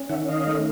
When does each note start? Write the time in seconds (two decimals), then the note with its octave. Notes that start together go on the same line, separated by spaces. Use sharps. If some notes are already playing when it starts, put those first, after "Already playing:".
Already playing: C#4
0.09 D#3 E5 F#5
0.28 D#5 F5
0.47 A3